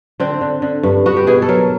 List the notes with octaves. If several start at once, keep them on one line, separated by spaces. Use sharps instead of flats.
D3 C4
D3
D3
G2
B3 F#4
G4
B2 G#4
A4
F#3 A#4